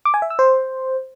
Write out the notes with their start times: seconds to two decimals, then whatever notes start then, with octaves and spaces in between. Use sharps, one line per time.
0.05 D6
0.14 G#5
0.22 E5
0.30 E6
0.39 C5